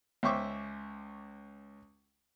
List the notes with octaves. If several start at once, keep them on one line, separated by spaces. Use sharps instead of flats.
C#2 C5 E5 G5 C#6 D6